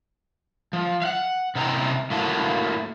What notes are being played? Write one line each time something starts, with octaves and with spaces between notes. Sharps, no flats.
F3
F5 F#5
C3 D#4 E4 A#4 G5 A#5
A2 A3 A#3 F4 F#4 A5